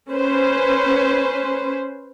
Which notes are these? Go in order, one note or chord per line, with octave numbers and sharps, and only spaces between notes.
C#4 B4 C5